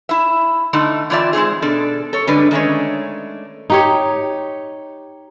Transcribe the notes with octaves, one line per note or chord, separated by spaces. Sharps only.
E4 E5
D3 A3 D#4 E4
E3 C4 F4 D5 E5
G#3 C4 D#4 G#4
B2 D4 A4
A4 C#5
D3 G3 G#3 D4 B4
D#3 G#3 A3 C#4 D4 C#5
D#4 G4 C#5